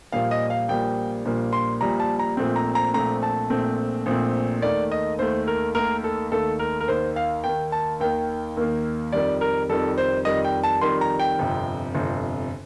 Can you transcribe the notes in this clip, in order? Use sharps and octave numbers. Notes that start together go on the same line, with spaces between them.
A#1 A#2 G3 A#3 F5
D#5
F5
A#1 A#2 G3 A#3 G5
A#1 A#2 G3 A#3
C6
A#1 A#2 G3 A#3 A#5
A5
A#5
A#1 A#2 A3 C4
A#5
A#5
A#1 A#2 A3 C4 A#5
A5
A#1 A#2 A3 C4
A#1 A#2 A3 C4
D#2 D#3 A3 D5
D#5
D#2 D#3 A3 C5
A#4
D#2 D#3 A3 A#4
A4
D#2 D#3 A3 A4
A#4
A#4
D#2 D#3 A#3 C5
F5
D#2 D#3 A#3 G5
A5
D#2 D#3 A#3 G5
D#2 D#3 A#3
F2 D#3 G3 D5
A#4
F2 D#3 G3 A4
C5
F2 D#3 G3 D#5
G5
A5
F2 D#3 G3 C6
A#5
G5
G1 F2 C3
G1 F2 C3